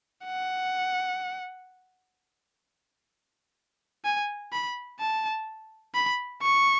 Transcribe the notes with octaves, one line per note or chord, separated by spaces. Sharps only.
F#5
G#5
B5
A5
B5
C#6